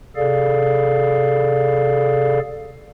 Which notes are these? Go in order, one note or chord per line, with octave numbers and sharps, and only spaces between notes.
C3 G#4 A4 D5 F5